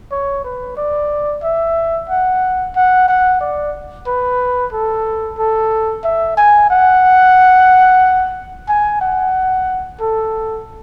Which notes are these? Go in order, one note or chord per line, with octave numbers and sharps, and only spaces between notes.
C#5
B4
D5
E5
F#5
F#5
F#5
D5
B4
A4
A4
E5
G#5
F#5
G#5
F#5
A4